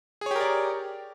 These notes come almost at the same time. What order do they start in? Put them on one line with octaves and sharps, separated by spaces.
G#4 C#5 G4 A#4 D5